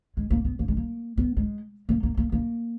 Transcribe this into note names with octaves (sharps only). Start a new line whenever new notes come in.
G#3
A#3
B3
A#3
G#3
A#3
B3
G#3
A#3
A#3
A#3
A#3